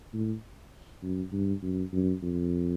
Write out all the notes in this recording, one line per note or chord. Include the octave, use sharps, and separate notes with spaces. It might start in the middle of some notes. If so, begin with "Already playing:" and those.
A2
F#2
G2
F#2
F#2
F2